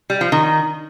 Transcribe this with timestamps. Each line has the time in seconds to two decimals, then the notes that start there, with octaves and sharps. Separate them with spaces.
0.10 G3
0.21 F3
0.32 D#3